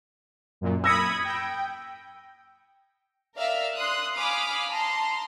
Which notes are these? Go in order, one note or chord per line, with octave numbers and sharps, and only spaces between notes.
F#2 A#2
B5 D#6 E6 G#6 A#6 C#7
G5
A#4 D5 E5 F5
C6 D#6 F#6
F5 G#5 B5 D6 D#6 F6
A5 A#5 C6